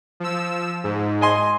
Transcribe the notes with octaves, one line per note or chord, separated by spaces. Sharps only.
F3 E6
G#2
D#5 G#5 C6